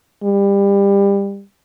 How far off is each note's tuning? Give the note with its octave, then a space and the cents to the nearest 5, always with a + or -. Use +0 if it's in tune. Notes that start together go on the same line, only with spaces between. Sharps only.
G3 +25